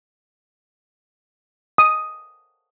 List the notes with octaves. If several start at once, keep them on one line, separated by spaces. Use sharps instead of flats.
D#6